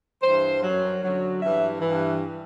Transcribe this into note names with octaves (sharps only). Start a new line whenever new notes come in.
G2 E3 C5
F#2 F#3
F#2 D3 F#3
G2 E3 E5
G2 E3